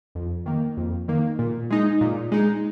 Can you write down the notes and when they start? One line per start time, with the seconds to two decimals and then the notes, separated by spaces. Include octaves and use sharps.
0.15 F2
0.46 D#3 A#3
0.77 F2
1.08 D#3 A#3
1.39 A#2
1.70 G#3 D#4
2.01 A#2
2.32 G#3 D#4